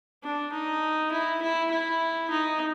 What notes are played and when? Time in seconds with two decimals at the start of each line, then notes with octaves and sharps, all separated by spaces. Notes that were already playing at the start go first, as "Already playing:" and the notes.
0.24 D4
0.53 D#4
1.11 E4
1.42 E4
1.71 E4
2.30 D#4